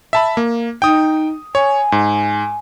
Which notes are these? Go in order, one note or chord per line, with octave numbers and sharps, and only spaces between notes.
E5 A5 B5
A#3
D#4 G5 D#6
C#5 G#5
G#2